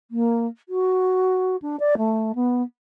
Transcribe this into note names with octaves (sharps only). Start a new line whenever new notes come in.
A#3
F#4
D4
D5
A3
B3